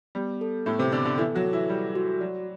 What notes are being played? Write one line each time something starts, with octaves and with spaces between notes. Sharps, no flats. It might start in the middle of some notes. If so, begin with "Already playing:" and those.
G3 B3
A4
A2 A3 B3
C3 C4
D3 B3 D4
D3 D4
E3 E4 A4
F#3 F#4
A4
E3 E4
G3 A4
F#4
F#3 D5